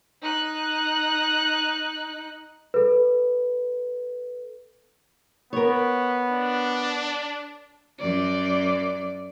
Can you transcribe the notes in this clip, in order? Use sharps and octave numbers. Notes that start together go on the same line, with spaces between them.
D#4 F#6
A4 B4
B3 A#4 C#5
D4
F#2 D5